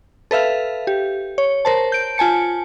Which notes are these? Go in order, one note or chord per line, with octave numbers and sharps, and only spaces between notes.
A4 B4 E5 F5
G4
C#5
A#4 C5 A5
G6 D7
F4 G#5 A5 C#7